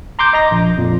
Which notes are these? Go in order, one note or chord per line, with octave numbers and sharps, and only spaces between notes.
A#5 C6 D6 G6
D#5 A#5 A#6
A#1
F2 A#2